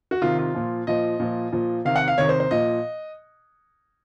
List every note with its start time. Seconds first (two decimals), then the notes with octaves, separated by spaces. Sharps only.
0.11 F#4
0.22 C3 D#3 F4
0.39 F4
0.54 A#2 F3
0.87 A#2 F3 D#5
1.20 A#2 F3
1.52 A#2 F3
1.85 C3 D#3 F5
1.96 F#5
2.08 F5
2.18 C3 D#3 C#5
2.29 C5
2.40 C5
2.51 A#2 F3 D#5